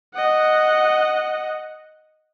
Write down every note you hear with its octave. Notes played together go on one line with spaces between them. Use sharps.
D#5 F#5